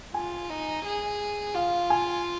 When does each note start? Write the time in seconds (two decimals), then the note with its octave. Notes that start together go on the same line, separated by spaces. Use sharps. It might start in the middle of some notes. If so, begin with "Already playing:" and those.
0.14 F4 G#5
0.50 D#4
0.85 G#4
1.55 F4 F5
1.90 G#5